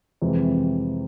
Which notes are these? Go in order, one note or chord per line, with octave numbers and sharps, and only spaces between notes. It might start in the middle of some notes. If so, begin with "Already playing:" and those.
F2 C3 E3 G#3